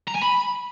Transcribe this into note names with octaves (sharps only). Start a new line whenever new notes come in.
A#5
G#5
B5